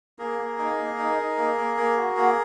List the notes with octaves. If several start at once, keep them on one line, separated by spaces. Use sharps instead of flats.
A#3 G#4 A#4
A#3
D#4
A#3
D#4
D#4
A#3
A#3
A#3
F#4
A#3